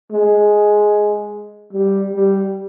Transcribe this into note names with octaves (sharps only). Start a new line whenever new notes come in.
G#3
G3
G3